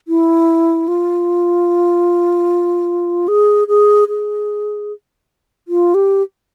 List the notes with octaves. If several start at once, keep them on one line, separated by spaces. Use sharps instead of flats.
E4
F4
G#4
G#4
G#4
F4
G4